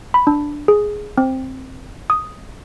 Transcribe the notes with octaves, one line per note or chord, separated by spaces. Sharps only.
B5
D4
G#4
C4
D#6